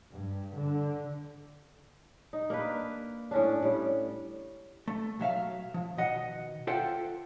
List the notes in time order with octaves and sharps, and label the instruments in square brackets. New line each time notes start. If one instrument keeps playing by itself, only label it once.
[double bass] G2
D3
[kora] D#4
A#3 D4 B4
A2 C#4 D4
A2 G3
[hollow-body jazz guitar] A3
B1 F#3 E5 F5
F3
B2 D#3 D#5 F#5
F4 A4 C5 E5 F#5 G5